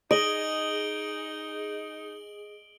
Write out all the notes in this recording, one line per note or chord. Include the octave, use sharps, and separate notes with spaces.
D#4 G#4 D#5 D7 F#7 G7